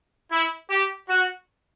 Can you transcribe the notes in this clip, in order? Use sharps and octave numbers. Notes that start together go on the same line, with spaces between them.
E4
G4
F#4